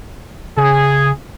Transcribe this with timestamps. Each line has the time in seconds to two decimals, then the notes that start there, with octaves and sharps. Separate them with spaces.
0.57 C#3 G#4